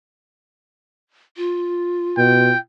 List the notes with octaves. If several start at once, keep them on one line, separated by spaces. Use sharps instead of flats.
F4
B2 G5